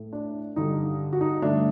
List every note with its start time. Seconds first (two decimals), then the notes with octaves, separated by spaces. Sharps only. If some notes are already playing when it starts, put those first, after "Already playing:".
Already playing: A2 A3
0.13 D4
0.56 G2 D3 G3 D#4
1.13 F#4
1.21 D#4
1.42 G2 D3 A3 D4